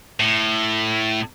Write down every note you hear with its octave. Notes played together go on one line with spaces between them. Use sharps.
A2